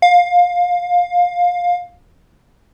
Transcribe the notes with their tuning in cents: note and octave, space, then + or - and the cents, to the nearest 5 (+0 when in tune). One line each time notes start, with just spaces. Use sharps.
F5 +20